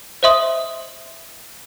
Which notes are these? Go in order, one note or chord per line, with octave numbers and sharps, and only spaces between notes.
C5 D#5 E5 C6 D#6